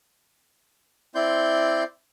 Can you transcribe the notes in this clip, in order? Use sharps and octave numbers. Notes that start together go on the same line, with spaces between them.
C4 E4 D5 C6 G6